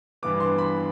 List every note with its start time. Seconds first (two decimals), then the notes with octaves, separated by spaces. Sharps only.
0.23 G2 E3 B3 D6
0.40 C6
0.58 B5